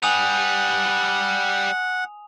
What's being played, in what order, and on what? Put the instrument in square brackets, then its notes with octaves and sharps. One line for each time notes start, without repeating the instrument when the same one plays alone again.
[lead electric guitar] G3 B4 [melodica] F#5 [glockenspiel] G#5 D#6 F7